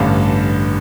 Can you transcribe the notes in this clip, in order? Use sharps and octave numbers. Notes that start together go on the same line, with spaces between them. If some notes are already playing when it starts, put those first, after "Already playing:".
Already playing: A1 G2 D3 F5 A5